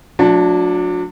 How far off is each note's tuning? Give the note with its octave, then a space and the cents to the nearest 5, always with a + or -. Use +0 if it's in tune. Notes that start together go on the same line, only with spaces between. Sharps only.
F#3 -40 A3 +0 D4 +0